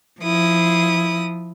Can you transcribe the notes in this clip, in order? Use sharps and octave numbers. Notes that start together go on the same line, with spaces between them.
F3 E4 D#6